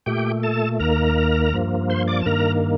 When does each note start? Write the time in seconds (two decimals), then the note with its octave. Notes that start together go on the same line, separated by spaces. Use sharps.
0.06 A#2 A3 G4 G5
0.43 A4 A5
0.80 D#2 D#3 A#3 A#4 A#5
1.53 G2 F3 A#3
1.90 C5 C6
2.07 D5 D6
2.21 A5
2.26 G2 D#3 A#3 A#4 A#5